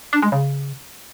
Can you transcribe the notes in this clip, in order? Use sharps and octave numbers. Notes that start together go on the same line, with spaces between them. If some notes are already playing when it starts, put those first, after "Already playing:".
D4
G#3
C#3